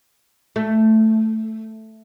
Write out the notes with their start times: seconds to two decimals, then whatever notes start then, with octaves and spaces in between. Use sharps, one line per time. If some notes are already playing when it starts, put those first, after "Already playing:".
0.56 A3